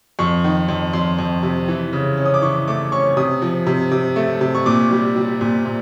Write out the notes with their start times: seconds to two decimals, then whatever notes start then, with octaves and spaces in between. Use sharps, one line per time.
0.19 F2 C#6
0.44 D#3
0.69 F2
0.93 F2 C6
1.19 F2
1.43 C3
1.68 E3
1.93 C#3
2.17 C#4
2.26 D#6
2.34 D6
2.42 E3 C#6
2.68 A3 D6
2.92 C#4 C#6
3.17 C3 D#6
3.42 F3
3.67 C3
3.91 C3
4.16 A3
4.41 C3
4.55 C#6
4.66 A#2 D6
4.91 G3
5.16 G3
5.41 A#2
5.65 A#2